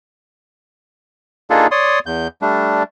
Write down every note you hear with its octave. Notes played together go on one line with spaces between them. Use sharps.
A#3 D4 D#4 F4 G#4 A4
C#5 D5 C6 D#6
E2 G6
G3 A3 D4